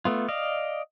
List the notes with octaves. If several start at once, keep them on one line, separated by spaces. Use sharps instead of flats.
A3 B3 F4
D5 D#5 F5